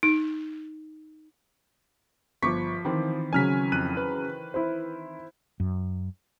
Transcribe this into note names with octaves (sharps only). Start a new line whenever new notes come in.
D#4
G1 F3 C#6 D6 B6
D#3 E3 C4
C#3 F#3 C#4 G#5 F6 B6
F2 F#6 D#7
B4
E4 C5
F#2